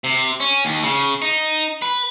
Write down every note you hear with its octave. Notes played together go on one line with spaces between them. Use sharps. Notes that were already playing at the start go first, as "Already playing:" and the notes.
C3
C#4
D#2
C#3
D#4
B4